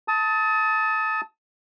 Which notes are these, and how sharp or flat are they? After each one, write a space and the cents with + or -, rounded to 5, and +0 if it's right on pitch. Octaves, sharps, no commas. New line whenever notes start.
A5 +0 D#6 +35